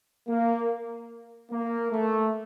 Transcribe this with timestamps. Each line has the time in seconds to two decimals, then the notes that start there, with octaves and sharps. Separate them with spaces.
0.27 A#3
1.49 A#3
1.91 A3